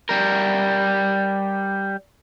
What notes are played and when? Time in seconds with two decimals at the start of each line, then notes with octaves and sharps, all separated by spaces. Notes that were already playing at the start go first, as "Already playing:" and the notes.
0.09 G3 A#4